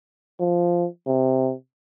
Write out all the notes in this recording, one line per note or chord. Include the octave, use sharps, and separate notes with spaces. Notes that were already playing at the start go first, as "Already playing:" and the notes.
F3
C3